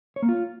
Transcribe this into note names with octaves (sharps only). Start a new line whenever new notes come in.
C#5
A#3
F4